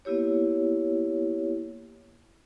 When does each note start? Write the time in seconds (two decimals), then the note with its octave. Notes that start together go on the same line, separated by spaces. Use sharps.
0.05 A#3 B3 E4 G4 C#5